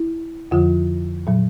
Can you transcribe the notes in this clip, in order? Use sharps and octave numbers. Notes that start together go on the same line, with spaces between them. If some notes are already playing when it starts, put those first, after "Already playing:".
Already playing: E4
F2 D3 F3 F4
A#2 F#3